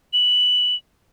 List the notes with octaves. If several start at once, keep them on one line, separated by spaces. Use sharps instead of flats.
F#7